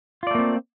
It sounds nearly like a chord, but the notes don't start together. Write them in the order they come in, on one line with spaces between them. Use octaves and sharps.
F4 D5 A3 A#3 C4